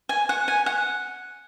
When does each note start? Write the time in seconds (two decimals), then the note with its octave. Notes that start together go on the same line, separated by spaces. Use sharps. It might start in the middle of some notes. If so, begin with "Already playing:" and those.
0.09 G#5
0.29 F#5
0.48 G#5
0.66 F#5